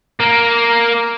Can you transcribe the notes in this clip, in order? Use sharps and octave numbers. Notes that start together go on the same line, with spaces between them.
A#3